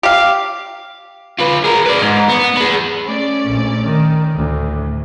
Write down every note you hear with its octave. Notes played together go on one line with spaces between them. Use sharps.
G4 F5
F4 B4
G#4 A#4
B4 D5
G#2
B3
G#4 B4
A3 C#4 D5
A#1
D#3
D2 A2